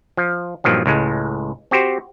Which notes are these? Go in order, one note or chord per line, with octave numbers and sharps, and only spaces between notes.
F3
G2 A#2 D#3 F3 F#3
C#2 A2 G#3
C4 F#4 G4 C5